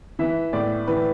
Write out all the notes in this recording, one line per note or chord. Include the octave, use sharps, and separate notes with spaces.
E3 E5
A2 D5
E3 B4